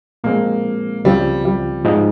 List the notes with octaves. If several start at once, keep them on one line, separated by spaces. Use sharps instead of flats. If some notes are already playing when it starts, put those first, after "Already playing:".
A#2 F3 G#3 A#3 C4
C#2 C#3 F3 G3 C4 F4
G3
G#2 F3 G#3 D#4